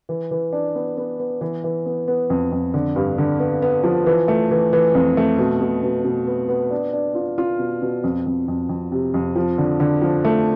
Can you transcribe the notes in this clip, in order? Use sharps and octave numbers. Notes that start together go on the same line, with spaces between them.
E3
E3
D4
B3
B3
B3
E3
E3
B3
B3
F2
F2
D3
G2
D3
B3
B3
F3
E3
A3
E3
E3
F2
A3
B2
B2
B2
B2
B3
B3
D4
D4
F4
F4
B2
B2
F2
F2
F2
F2
C3
F2
F3
D3
D3
F3
A3